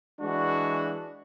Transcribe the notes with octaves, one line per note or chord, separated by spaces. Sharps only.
E3 G#3 D4 F#4